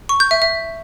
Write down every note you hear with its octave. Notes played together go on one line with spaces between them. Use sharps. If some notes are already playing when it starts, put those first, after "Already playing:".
C#6
G6
E5
E5